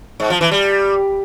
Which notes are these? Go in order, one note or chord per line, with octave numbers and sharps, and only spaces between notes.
G#2
F3
E3
G3